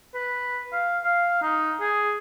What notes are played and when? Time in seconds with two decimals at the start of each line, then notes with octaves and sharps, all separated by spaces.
0.14 B4
0.73 F5
1.05 F5
1.42 D#4
1.81 G#4